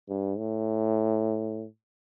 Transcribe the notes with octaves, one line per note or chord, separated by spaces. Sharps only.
G2
A2